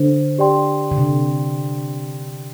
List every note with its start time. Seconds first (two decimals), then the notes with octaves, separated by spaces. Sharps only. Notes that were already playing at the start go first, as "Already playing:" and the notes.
Already playing: D3 C5
0.38 G4 D5 G5 C6
0.91 D3
0.98 C3